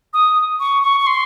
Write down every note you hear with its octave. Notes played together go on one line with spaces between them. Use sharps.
D#6
C#6
C#6
C#6
C6